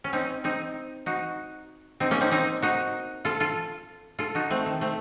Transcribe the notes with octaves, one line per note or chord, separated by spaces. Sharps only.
C#4
C4 D#4
C4 D#4
D#4 F#4
C4 D#4
A#3 C#4
C4 D#4
C4 D#4
D#4 F#4
F4 A4
F4 A4
F4 A4
D#4 F#4
A3 C4
D#3
A3 C4